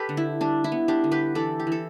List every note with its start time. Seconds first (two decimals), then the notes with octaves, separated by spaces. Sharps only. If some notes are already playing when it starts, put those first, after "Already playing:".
Already playing: G4 A4 B4
0.09 D3
0.17 E4
0.41 G3 D4
0.64 E4
0.72 B3
0.88 D4 G4
1.04 D3
1.12 G4 B4
1.35 E3 A4 D5
1.60 G4
1.67 E3 A4